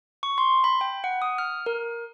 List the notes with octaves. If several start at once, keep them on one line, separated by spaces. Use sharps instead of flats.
C#6
C6
B5
G5
F#5
D#6
F6
A#4